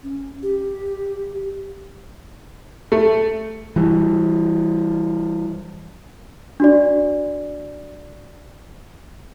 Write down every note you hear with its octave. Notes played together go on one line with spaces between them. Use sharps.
C#4
G4
A3
E3 G3
D4 F#4 D5